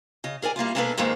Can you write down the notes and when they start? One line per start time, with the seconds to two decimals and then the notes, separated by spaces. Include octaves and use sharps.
0.24 C#3 D#5
0.42 G#4 A#4 D5 G#5
0.56 G3 A#3 E4 F4
0.75 B2 G#3 A#3 D4 A4 B4
0.97 F2 G#2 D#3 G#3 A#3